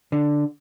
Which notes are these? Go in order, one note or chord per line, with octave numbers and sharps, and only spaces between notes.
D3